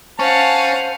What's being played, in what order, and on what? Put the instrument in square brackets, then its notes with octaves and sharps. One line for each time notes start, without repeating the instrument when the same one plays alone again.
[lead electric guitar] C#4 [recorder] C5 [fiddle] F5 F#5 [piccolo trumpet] A5